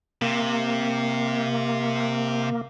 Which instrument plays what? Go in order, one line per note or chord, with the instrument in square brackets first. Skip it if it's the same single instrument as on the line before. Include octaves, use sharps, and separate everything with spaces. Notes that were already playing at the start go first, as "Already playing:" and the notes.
[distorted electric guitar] C3 [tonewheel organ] A#3